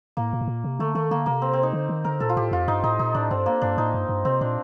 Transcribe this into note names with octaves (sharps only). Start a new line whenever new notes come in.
A2 A#3
A#2
A2
A#2
C3
D3 A3
D#3 A3
D3 A#3
C3 A#3
C4
C4
D#4
D3
D#3
D3 A#4
A#2 A4
F4
A2 G4
F2 F4
G2 D#4
A2 D#4
A#2 D#4
A2 D4
G2 C4
A#3
G2 D4
A2 D#4
G2
G2
C3 C4
A#2 D4